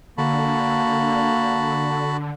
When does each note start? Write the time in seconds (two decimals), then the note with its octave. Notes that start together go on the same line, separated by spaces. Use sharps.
0.18 D3 A#3 F#4 A5 B5